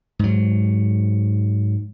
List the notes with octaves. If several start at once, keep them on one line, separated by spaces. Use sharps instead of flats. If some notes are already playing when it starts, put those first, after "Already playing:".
G#2 F#3